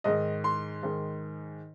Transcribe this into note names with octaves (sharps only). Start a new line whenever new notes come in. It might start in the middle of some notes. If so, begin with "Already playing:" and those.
G#2 D#3 D#5
C6
G#2 D#3